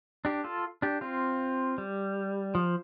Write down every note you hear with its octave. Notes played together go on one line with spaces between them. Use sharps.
D4 G4
F4 A4
D4 G4
C4 F4
G3
F3